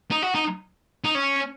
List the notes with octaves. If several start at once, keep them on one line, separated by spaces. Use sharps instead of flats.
D#4
F#4
D#4
D#4
C#4